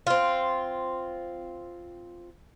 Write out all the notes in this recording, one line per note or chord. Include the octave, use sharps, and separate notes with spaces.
C4 F4